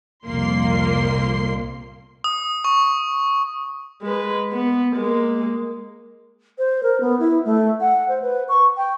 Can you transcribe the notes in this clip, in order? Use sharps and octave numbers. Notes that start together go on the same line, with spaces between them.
C2 F2 A#2 A#3 C6 C7
D#6
C#6
G#3 B4
B3
G#3 A#3
C5
A#4
B3
E4
A3
F#5
C5
B4
C#6
G5